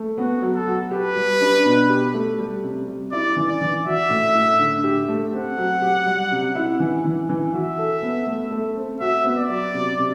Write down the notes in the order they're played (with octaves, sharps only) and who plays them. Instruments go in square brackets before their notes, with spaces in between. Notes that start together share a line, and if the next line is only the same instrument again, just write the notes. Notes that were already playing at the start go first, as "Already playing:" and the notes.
Already playing: [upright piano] A3
[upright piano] B3 [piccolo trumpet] F#4
[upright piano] F#3
[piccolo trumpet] A4
[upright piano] F#4
[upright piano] G4 [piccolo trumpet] B4
[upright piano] G3
D4
B2
G4
A3
G3
C3
G3
[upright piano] E4 [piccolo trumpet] D5
[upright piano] E3
[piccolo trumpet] D5
[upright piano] E3
[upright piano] F#4 [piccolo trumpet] E5
[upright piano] A2
A2
D3
G4
A3
[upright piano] C4 [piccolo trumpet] F#5
[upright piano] F#3
G4
G3
C3
E4
E3
E3
E3
[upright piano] F#4 [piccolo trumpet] E5
[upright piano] A4
B3
A3
A3
C4
[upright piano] F#4 [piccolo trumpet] E5
[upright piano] B3
[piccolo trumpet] D5
[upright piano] F#3
C3
C3